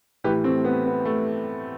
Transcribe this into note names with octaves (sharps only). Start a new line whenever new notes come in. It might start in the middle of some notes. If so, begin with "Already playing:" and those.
A2 E3 G4 B4
A3 C4
B3
B3
A3